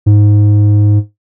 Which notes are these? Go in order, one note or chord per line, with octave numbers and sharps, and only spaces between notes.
G#2